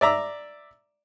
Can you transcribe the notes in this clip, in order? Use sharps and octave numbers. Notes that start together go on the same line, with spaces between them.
D5 E5 A#5 D6